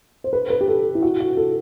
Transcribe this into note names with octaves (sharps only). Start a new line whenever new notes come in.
C5
B4
B4
G4
A4
E4
F#4
F#4
A4